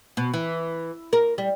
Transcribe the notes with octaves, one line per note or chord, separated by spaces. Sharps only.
B2
E3
A#4
G3